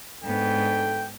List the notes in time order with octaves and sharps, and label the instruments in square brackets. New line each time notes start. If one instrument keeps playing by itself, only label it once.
[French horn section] D2 D4 A4 [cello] G#2 B3 [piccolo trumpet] G5